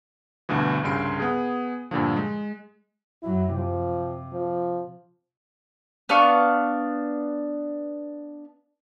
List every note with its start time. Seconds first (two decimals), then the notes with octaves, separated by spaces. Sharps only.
0.49 G1 D2 G2 B2 E3
0.83 C2 G2 C#3 C6 D7
1.20 B3 G#4
1.91 G2 A#2 D3 F3
2.16 G#3
3.23 F#2 F#3 E4
3.55 C3 F3
4.33 F3
6.09 B3 D4 F5 C#6